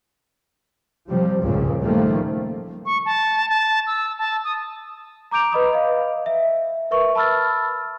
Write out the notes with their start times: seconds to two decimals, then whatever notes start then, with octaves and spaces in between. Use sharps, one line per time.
1.08 C3 F3 G3
1.42 C#2 G2 A#2 C#3
1.83 D#3 F3 G3 A3 A#3
2.86 C#6
3.06 A5
3.49 A5
3.87 E6
4.19 A5
4.44 D#6
5.31 A#5 D6 G6 D7 F7
5.52 B4 D#5 B5 D#6
5.73 D#5 F5
6.26 E5
6.91 A#4 B4 E5 C#6
7.15 A5 B5 E6 F6 A6